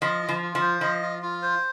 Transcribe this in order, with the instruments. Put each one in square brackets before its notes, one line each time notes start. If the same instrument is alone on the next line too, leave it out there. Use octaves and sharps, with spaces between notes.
[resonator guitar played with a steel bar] F3 [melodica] D#5
[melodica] F4
[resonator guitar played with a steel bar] F3
[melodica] F4
[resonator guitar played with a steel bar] F3
[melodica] C5
[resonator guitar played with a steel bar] F3 [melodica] D#5
[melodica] F4
F4
C5